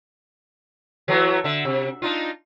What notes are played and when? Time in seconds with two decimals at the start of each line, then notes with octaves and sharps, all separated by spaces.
1.08 E3 F#3 A3
1.44 D3 E5
1.65 C3
2.02 D4 D#4 F4